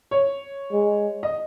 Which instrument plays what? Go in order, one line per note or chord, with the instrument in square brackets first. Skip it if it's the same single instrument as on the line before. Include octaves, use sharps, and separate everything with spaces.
[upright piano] C#5
[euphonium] G#3
[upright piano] D#5